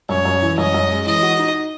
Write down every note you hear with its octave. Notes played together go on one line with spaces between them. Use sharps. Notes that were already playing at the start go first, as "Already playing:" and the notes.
F#2 C#5
F#2
E3
F#2 D#5
F#2
G#3
E3 D#5
F#4
D#4